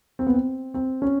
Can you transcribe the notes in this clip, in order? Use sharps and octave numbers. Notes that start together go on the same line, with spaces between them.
C4
B3
C4
C4
C#4